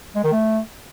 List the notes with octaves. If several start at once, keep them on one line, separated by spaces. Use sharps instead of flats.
G#3
D#3
A3